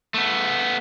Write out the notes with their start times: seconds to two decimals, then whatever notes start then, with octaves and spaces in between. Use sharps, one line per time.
0.14 A3 B3